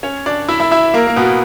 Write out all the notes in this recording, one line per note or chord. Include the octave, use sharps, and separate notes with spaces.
C#4 C#5
D4 D5
E4 E5
E4 E5
E4 E5
A#3 A#4
A#3
B2 B3